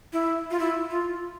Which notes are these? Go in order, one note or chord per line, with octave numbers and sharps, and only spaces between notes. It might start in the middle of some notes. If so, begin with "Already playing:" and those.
E4
F4
E4
F4